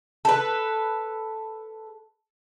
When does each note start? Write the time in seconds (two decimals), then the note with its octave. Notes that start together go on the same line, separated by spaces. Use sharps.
0.25 A4 B4